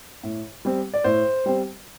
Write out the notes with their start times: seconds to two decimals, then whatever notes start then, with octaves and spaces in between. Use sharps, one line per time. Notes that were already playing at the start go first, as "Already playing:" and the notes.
0.23 A2
0.65 G3 C4
0.94 D5
1.04 A2 C5
1.46 G3 C4